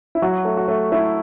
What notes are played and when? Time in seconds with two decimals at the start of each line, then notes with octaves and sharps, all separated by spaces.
0.15 E4
0.22 F#3 F#4
0.45 A3
0.57 F#4
0.68 A3
0.92 A3 E4